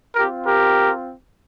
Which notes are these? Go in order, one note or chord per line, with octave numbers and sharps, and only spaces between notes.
C4 F4 G4 A#4
G4 A#4